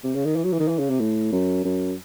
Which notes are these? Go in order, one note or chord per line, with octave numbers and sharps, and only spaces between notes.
C3
C#3
D#3
E3
F#3
E3
D#3
E3
C#3
C3
A2
F#2
F#2